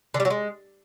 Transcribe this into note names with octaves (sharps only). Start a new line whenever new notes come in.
D3
G3
F#3
G#3